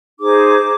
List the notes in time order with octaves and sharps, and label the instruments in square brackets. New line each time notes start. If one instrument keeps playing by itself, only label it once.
[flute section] D#4 G#4 C5 D6